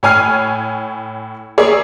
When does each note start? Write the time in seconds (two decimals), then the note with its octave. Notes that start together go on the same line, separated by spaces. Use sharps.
0.03 A2 C#5 G#5 F6 C7
1.58 G#4 A#4 C#5 D5 E5